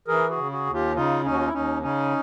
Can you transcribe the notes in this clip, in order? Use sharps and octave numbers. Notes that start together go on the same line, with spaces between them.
E3 G#4 A#4
F#4 G#4
C#3
F#4 G#4
D#2
F4 G4
C#3 D#4 F4
D#2 C#4 D#4
F#4
F4
E4
D#2 C#4 D#4
C#3 C#4 D#4